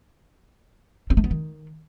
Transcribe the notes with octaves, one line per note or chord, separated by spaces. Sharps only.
C4
A3
B3
D#3